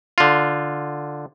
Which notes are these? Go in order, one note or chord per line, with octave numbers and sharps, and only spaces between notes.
D3 F4